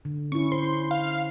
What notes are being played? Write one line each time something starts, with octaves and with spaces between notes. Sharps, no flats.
D3
C#4 E4 C#6
C5 C6
F5